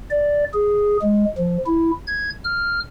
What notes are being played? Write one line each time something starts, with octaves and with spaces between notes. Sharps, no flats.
D5
G#4
G#3
F3
E4
G#6
F6